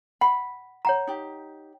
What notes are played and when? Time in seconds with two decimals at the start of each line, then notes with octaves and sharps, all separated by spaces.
0.21 F#5 B5
0.85 C#5 F#5 A#5
1.07 D#4 G4